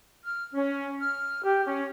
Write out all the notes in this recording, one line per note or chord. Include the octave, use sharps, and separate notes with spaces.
F6
C#4
F6
G4
C#4